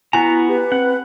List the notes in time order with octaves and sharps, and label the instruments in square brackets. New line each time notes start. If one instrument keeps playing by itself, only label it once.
[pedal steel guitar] B3 F#4 A#5 [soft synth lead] E4 [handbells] G#5
[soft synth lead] G4 [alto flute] B4
[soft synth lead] C4 [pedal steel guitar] F#5